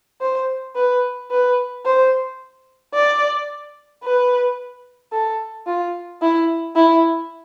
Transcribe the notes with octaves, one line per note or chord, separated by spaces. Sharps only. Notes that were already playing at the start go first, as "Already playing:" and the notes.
C5
B4
B4
C5
D5
B4
A4
F4
E4
E4